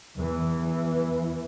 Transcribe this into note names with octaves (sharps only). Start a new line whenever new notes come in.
E2 E3